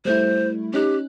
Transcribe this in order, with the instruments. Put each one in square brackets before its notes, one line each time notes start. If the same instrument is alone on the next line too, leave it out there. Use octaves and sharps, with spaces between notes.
[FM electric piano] G3 A3 E4 [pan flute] C5
[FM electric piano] C#4 D#4 F#6 [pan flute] G4